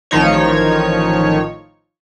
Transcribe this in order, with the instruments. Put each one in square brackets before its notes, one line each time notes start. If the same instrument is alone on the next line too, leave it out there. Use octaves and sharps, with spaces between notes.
[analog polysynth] A1 D#3 F3 D#4 C#5